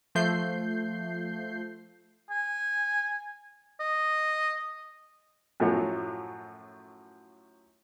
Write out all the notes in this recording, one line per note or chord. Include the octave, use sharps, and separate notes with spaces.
F3 A3 G6 C7
G#5
D#5
F#2 A2 F3 F#3